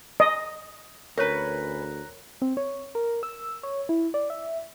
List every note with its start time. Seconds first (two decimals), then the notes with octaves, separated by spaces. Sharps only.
0.20 D#5
1.18 D2 C#4 A#4 B4 C#5 A#5 F#6 A#6
2.42 C4
2.57 C#5
2.95 A#4
3.23 E6
3.63 C#5
3.89 E4
4.14 D5
4.30 E5